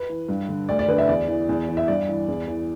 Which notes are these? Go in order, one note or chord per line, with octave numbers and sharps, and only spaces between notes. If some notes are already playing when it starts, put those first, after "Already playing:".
Already playing: B4
E3
G2
D3
D2 D5
D5
D3 B4
E5
E2 D5
E3
E2
E3
E5
G2 D5
E3
E2
E3